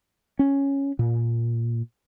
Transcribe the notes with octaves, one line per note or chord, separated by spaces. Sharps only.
C#4
A#2